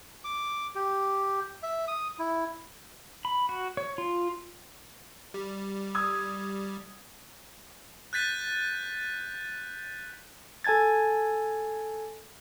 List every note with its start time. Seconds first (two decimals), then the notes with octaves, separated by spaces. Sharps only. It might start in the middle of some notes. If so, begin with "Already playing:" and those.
0.24 D6
0.75 G4
1.63 E5
1.88 D#6
2.19 E4
3.25 B5
3.49 F#4
3.77 C#5
3.98 F4
5.34 G3
5.95 D#6 E6 G#6
8.13 F#6 G6 A6 B6 D#7
10.64 A4 G#5 A5 G#6 A6